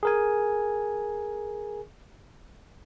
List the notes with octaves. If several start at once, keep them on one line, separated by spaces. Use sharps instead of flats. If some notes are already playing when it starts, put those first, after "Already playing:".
G#4 A#4 G#5